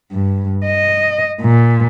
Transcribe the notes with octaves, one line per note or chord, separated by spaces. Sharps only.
G2
D#5
A#2